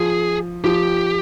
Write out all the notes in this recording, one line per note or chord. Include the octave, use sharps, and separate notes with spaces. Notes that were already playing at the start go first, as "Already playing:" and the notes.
Already playing: F3 G#4
F3 G4